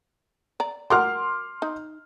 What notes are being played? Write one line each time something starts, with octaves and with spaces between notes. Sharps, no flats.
D5 A#5
F#4 A#4 F#5 C6 D6 F6
D#4